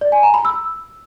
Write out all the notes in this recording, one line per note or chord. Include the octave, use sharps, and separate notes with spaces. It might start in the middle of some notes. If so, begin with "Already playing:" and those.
D5
G#5
A#5
B5
E6